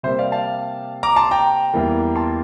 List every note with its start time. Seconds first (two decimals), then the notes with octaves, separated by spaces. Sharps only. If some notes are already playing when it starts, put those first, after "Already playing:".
0.03 C3 G3 A#3 C5 E5
0.19 D5 F5
0.32 F5 A5
1.03 A#5 D6
1.16 A5 C6
1.31 G5 A#5
1.73 E2 E3 G3 A#3
2.16 A5 C6